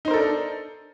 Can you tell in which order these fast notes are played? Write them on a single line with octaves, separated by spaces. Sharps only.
D#4 C5 A#4 A4 D4